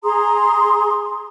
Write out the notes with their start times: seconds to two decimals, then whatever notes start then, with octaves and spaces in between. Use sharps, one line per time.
0.04 G#4 A#5 C6 D#6